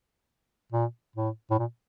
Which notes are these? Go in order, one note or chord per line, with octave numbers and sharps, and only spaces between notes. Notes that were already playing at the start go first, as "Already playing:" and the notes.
A#2
A2
A2
A#2